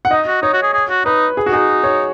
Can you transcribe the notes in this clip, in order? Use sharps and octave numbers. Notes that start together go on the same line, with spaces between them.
F#5
D#4 D#5
F#4
D#4 C#5
F#4
G#4
G#4
F#4
D#4 B4
G#4
F#4
D#4 G#4
C#5